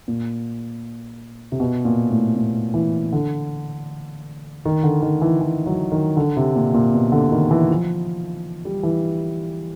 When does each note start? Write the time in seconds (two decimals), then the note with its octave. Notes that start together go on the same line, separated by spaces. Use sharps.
0.08 A#2
1.52 C3
1.60 B2
1.85 A#2
2.10 A2
2.37 A#2
2.74 E3
3.12 D3
4.65 D#3
4.83 D3
5.02 D#3
5.22 E3
5.41 E3
5.66 F#3
5.92 D#3
6.17 D3
6.37 C3
6.56 A#2
6.74 A#2
6.94 B2
7.12 D3
7.32 D#3
7.51 E3
7.70 F3
8.65 G3
8.83 E3